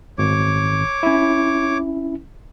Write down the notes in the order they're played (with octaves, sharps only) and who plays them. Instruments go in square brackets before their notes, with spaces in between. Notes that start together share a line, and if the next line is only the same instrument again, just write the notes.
[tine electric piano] G#1 [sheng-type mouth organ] C#5 D6
[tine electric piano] C#4 E4